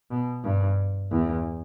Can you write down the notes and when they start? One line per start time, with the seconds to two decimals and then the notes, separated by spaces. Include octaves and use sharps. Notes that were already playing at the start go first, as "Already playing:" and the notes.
0.11 B2
0.44 G2
1.11 E2